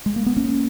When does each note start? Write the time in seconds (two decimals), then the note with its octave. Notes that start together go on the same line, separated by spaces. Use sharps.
0.06 G#3
0.16 A#3
0.26 B3
0.36 A#3 C#4